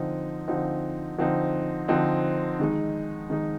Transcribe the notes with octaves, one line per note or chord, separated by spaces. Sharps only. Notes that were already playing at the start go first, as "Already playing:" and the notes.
Already playing: D3 F3 C4 D#4
D3 F3 C4 D#4
D3 F3 C4 D#4
D3 F3 C4 D#4
D#3 G#3 D#4
D#3 G#3 D#4